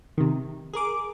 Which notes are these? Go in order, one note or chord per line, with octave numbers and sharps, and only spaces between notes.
C3 D#3
G#4 A#4 D6